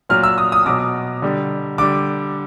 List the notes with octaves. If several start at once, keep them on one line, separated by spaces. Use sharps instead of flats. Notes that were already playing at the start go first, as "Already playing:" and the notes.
A#2 F#3 F6
E6
D#6
D#6
B2 F#3 D6
D3 G3
D3 G3 D6